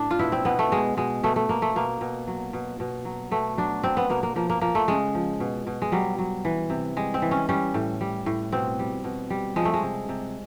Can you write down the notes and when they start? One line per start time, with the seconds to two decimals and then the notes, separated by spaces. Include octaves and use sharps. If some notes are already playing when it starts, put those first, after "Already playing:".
Already playing: A2 D4
0.11 F4
0.19 B2 E4
0.32 C4
0.45 B2 B3
0.59 A3
0.72 B2 G#3
0.97 B2 G#3
1.23 B2 A3
1.36 A3
1.49 B2 A#3
1.62 A3
1.76 B2 A#3
2.01 B2
2.27 F#3
2.53 B2
2.80 B2
3.05 F#3
3.31 B2 A3
3.57 F#3 D4
3.84 F#3 C4
3.97 B3
4.10 B2 A#3
4.23 A#3
4.36 F3 A#3
4.50 A#3
4.61 F3 A#3
4.75 A3
4.88 C#3 G#3
5.15 F3
5.40 B2
5.67 B2
5.82 G#3
5.92 F#3 G3
6.18 F#3
6.45 E3
6.70 C3
6.96 G3 G#3
7.14 C4
7.22 E3
7.31 C#4
7.49 G3 C#4
7.74 A2
8.01 G3
8.26 A2
8.52 B2 C4
8.79 G3
9.04 B2
9.30 G3
9.56 F3 G#3
9.65 A3
9.74 G#3
9.83 C3
10.09 C3